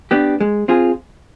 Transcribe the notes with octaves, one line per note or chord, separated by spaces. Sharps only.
B3 D4 G4
G#3
C4 F4 G#4